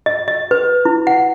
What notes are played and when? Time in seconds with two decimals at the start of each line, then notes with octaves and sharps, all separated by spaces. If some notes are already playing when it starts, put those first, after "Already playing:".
0.06 D#5
0.28 D#5
0.51 B4
0.85 E4
1.07 F#5